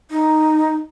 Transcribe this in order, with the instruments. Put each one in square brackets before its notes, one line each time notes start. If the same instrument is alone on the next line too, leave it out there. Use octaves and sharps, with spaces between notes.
[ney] D#4